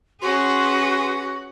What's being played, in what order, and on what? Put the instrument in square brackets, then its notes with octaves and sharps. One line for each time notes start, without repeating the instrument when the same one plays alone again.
[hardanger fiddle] C#4 F#5 [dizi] F#4 [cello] G#4 B4 [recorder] C6